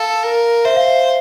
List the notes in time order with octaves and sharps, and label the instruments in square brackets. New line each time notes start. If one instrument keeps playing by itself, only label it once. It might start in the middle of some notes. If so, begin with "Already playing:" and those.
Already playing: [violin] A4 [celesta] F5
[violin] A#4
[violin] C5 [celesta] E5
[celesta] F5
E5